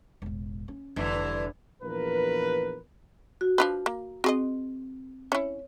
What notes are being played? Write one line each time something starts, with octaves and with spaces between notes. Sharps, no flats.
E1 A1
C#4
F1 G2 D3 E3
A#1 E2 F4 A#4 B4
F#4
F3 D4 B4
A#3
C4 F#4 G#4 D#5
C#4 E4 C#5